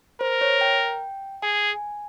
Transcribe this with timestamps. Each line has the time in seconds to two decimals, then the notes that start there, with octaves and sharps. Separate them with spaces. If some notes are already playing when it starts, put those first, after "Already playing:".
0.20 A#4 C5
0.41 C#5
0.61 G5
1.42 G#4 G#5